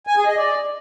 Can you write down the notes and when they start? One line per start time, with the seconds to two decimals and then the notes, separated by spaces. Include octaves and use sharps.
0.07 G#5
0.17 G#4
0.27 D#5
0.37 D5